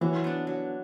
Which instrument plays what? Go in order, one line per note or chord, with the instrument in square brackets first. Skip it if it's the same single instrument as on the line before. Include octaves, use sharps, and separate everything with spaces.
[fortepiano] E3 [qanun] F#3
[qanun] B3 D4
F#3